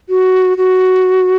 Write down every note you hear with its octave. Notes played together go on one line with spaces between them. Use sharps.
F#4
F#4